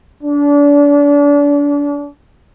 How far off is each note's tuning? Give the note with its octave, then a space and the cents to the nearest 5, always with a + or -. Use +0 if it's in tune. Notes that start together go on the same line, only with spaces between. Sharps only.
D4 -35